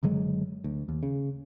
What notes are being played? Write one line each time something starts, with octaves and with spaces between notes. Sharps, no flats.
F#1 D3 F#3 G#3
D2
D#2
C#3